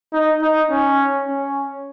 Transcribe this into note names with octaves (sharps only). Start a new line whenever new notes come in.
D#4
D#4
C#4
C#4